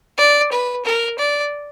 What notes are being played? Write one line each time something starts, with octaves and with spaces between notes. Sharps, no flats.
D5
B4
A#4
D5